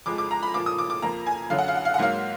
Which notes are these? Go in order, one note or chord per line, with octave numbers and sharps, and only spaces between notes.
F2 F3 G#3 D6
D6
A#5
B5
A#2 F3 A#3 D6
D#6
D6
D6
F2 F3 A#3 A#5
G#5
F#2 D3 F#3 F5
F#5
F5
F#5
F5
F#5
G#2 F#3 A#3 F5